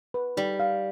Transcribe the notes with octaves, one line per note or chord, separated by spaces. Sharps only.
B4
G3 D#4
F5